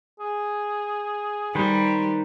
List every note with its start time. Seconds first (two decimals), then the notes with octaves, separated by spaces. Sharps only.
0.20 G#4
1.55 D#3 G3 B4 C5